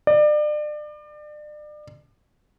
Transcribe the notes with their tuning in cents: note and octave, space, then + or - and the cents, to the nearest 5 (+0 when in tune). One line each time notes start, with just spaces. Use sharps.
D5 +35